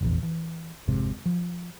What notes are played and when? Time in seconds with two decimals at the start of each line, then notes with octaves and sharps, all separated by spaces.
0.01 F1 A#1 E2
0.23 E3
0.87 G#1 F2 G#2 C3
1.26 F3